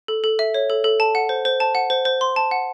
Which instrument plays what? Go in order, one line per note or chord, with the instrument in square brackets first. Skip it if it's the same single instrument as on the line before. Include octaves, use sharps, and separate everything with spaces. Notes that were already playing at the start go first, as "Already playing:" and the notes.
[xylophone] A4
A4
E5
C#5
A4
A4
A5
F#5
C5
C5
A5
F#5
C5
C5
C6
A5
F#5